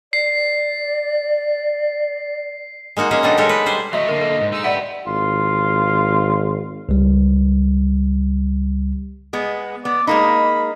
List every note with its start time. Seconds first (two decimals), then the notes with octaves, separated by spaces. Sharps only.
0.13 D5 C7
2.97 G#3 A#3 D#4 F#4
3.11 G#3 A#3 C#4 G#4
3.23 B2 F#3 G3 A3 D4 D#4
3.38 G#3 D#4 G4 A4 A#4 C#5
3.49 B4
3.66 G3 C5 G#5
3.93 F#3 A3 D#5 E5
4.09 D3 A#3 A#4
4.21 A4
4.41 G#2
4.52 G#3 D#4 E6
4.64 G4 B4 D5 E5 F#5
5.07 G#1 F4
6.89 C#2 G3
9.33 G#3 B3
9.85 B3 D5
10.07 G#3 A#3 D#4 B5